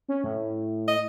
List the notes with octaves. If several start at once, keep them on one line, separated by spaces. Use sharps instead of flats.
C#4
A2
D#5